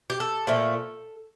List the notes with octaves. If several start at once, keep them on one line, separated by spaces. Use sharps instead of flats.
G4
A4
A#2 F3 A3